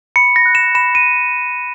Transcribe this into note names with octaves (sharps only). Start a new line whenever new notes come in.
B5 C#7
A#6
F#6
E7
B5 E7
D#7